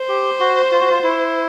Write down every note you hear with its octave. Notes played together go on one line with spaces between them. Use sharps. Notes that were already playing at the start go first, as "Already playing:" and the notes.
Already playing: C5
G4
F#4
F4
F#4
F4
E4